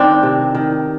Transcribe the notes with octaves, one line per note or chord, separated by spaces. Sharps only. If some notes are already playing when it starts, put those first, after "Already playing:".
Already playing: D#3 C4 D4
C3
D#3